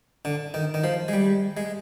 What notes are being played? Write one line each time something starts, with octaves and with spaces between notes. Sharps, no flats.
D3
D#3
D#3
F3
G#3
G3
G#3